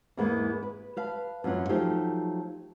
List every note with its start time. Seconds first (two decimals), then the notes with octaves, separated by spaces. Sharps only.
0.17 E2 G#2 E3 G#3 A#3 B3
0.63 B4
0.97 B4 F5 A5
1.44 F#2 E3 C#4 F4 F#5
1.69 F3 F#3 A3 D#4 G4 C5